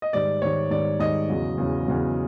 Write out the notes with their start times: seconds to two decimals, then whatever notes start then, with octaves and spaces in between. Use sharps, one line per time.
0.02 D#5
0.13 G#2 D#3 G3 D5
0.42 G#2 D#3 G3 C#5
0.70 G#2 D#3 G3 D5
0.99 G#2 D#3 G3 D#5
1.29 E2 C#3 F#3
1.57 E2 C#3 F#3
1.87 E2 C#3 F#3